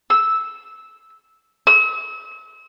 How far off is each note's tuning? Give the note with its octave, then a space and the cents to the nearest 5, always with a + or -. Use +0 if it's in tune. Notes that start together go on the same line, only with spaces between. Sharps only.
E6 -10
E6 -40